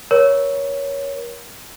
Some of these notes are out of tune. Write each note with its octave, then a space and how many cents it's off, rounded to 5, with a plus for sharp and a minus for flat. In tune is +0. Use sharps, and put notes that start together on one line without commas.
A#4 +30 C#5 +10